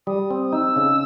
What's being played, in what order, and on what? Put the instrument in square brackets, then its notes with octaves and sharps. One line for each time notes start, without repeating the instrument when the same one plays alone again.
[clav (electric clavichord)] G3 [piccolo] D#6
[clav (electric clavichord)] C4
[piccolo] D#6
[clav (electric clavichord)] D#4 [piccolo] E6
[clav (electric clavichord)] C#3